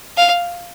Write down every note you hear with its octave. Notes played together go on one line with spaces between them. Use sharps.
F5